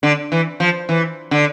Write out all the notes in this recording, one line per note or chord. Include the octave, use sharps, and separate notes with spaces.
D3
E3
F3
E3
D3